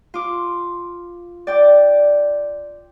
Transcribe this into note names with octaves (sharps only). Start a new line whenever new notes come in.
F4 D6
D5 G5 D6